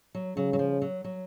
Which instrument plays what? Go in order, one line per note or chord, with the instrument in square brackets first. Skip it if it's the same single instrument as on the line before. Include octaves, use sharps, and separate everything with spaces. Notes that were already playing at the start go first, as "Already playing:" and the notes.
[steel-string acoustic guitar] F#3
[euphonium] C#3 [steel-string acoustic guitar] F#3
[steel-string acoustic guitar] F#3
F3
F#3
F#3